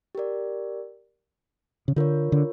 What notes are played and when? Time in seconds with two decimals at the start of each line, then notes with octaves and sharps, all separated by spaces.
0.15 G4 A#4 D5
1.88 C#3
1.96 D3 F4 A#4 C#5
2.32 D3